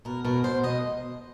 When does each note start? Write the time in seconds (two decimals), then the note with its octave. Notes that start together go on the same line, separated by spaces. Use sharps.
0.05 B2 A#4
0.25 B2 A#4
0.44 B2 C5
0.64 B2 D#5